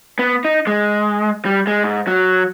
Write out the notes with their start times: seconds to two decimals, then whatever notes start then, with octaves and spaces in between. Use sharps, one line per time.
0.19 B3
0.45 D#4
0.67 G#3
1.45 G3
1.67 G#3
1.84 G#2
2.07 F#3